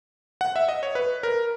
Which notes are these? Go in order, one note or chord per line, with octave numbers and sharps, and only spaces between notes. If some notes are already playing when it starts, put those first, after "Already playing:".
F#5
E5
D#5
C#5
B4
A#4